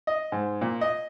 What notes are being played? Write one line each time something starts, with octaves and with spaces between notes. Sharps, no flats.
D#5
G#2
A#2
D#5